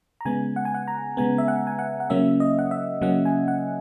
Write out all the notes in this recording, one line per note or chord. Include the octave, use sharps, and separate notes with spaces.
A#5
C#3 G#3 B3 G#5
F#5
G#5
F#5
A#5
C#3 G#3 B3 G#5
E5
F#5
G#5
F#5
F#5
C#3 F#3 A#3 C#4 E5
D#5
F#5
E5
C#3 F#3 A#3 C#4 F#5
G#5
F#5